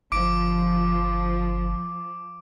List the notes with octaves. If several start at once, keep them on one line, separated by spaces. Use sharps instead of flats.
G1 F3 D6 D7